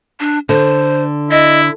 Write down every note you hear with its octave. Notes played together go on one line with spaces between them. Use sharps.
D4
D3 C5
E4 D#5